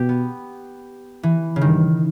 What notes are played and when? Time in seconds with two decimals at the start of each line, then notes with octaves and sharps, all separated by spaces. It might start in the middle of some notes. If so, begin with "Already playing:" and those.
Already playing: B2 G4
0.09 B3
1.23 E3
1.56 C#3
1.61 G2 D#3